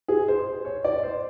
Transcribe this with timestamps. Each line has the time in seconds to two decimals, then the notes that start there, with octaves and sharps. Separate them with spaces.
0.08 G#4
0.28 C5
0.65 C#5
0.84 D5
1.03 C5